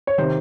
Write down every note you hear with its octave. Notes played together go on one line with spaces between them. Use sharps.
C#5
C3 D#3 C5